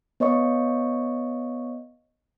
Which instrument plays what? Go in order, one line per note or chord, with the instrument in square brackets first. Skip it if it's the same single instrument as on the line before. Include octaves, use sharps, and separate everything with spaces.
[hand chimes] B3 C#5 D#5 C#6